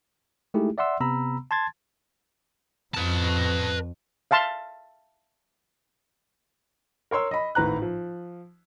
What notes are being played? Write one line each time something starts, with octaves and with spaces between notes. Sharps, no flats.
G#3 A3 D#4 E4 G4 G#4
D5 E5 F#5 C6 E6
C3 B3 A#5 B5 E6
A5 C6 G#6 A6
F2 B4 A5
E5 F5 A5 C6
A#4 C#5 C6 E6
D#5 B5
G#1 A2 B4 A#5 F#6
F3